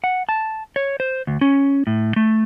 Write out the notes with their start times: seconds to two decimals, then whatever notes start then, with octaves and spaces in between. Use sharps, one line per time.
0.04 F#5
0.29 A5
0.76 C#5
1.00 C5
1.27 D2
1.41 C#4
1.87 A2
2.16 A3